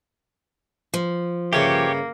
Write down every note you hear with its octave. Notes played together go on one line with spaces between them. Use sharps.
F3
G2 C#3 A#3 G4 C#5 E5